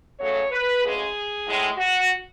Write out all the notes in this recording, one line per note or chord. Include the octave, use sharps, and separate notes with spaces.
F#2 C#3 F#3 A3 C#5
B4
D2 C#3 G#3 G#4
A2 G#3
F#4